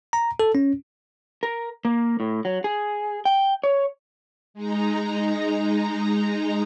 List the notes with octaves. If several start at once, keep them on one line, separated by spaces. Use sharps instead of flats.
A#5
A4
C#4
A#4
A#3
A2
F#3
G#4
G5
C#5
G#3 D#4 A#5